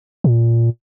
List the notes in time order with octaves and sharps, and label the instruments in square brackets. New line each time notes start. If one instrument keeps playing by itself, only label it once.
[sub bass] A#2